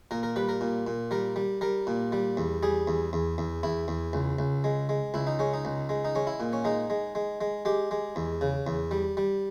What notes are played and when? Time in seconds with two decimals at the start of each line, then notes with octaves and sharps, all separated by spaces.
0.11 A#2 A#4
0.23 A#4
0.36 G3 B4
0.49 A#4
0.61 A#2
0.87 A#2
1.11 G3 A#4
1.36 G3
1.61 G3 A#4
1.87 A#2
2.12 G3
2.37 E2
2.63 G3 G#4
2.88 E2
3.13 E2
3.38 E2
3.63 E2 E4
3.88 E2
4.13 C#2
4.39 C#2
4.64 G#3
4.89 G#3
5.14 C#2 E4
5.27 D#4
5.39 G#3 C#4
5.54 D#4
5.65 C#2
5.89 G#3
6.05 D#4
6.15 G#3 C#4
6.27 E4
6.40 A#2
6.53 C#4
6.65 G#3 D#4
6.90 G#3
7.15 G#3
7.41 G#3
7.65 G#3 G4
7.91 G#3
8.16 E2
8.41 C#3
8.67 E2
8.91 G3
9.17 G3